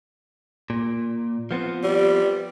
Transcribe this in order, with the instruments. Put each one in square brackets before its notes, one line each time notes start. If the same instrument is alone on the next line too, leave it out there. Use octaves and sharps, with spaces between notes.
[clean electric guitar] A#2
F3 B3 C4
[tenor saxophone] G3